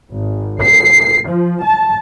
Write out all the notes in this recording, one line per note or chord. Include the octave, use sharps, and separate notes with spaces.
G#1
C7
F3
A5